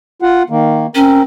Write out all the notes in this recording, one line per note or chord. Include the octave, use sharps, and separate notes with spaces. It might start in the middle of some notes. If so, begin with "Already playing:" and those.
F4 F#5
D#3 A#3
C4 C#4 A#4